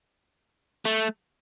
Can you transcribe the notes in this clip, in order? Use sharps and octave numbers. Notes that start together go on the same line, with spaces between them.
A3